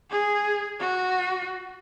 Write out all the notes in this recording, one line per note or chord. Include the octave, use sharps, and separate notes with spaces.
G#4
F#4